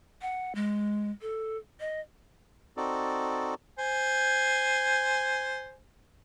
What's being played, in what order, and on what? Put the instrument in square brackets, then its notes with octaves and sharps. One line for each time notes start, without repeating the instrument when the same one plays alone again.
[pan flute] F#5
G#3
A4
D#5
[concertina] C4 D#4 F#4 A4 D5
[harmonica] C5 G#5